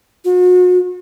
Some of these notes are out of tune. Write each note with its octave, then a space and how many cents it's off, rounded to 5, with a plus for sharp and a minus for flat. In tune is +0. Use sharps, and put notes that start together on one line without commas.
F#4 -40